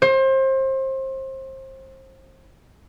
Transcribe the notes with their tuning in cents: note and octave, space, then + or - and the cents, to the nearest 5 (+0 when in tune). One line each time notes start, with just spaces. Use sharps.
C5 +30